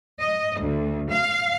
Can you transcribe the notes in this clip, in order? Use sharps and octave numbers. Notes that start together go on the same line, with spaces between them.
D#5
D2
F5